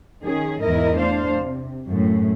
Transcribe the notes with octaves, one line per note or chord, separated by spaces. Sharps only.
D#3 C#4 G#4
E2 G#2 E4 A#4 D#5
A3 D4 C5 F5
C3
F#2 A2